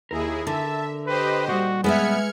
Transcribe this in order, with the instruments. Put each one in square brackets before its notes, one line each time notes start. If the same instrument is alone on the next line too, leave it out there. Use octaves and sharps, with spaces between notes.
[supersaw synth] D#2 E4 G#4 [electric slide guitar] A#4
[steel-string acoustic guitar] D3 [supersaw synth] E5 [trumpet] A5
[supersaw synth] G4 C5 D#5 [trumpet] B4
[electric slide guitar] A#2 G3 [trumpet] F#4
[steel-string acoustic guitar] G#3 B4 E5 [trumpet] B3 [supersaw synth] F6 G#6 C#7